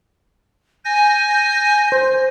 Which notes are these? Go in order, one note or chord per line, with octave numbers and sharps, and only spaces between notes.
G#5 G6 A#6
C5